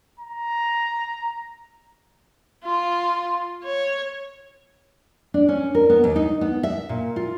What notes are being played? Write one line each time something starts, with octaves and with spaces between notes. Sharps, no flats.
A#5
F4
C#5
D4
C#4
A#4
B3
D#2
D#4
B3
E5
A#2
F4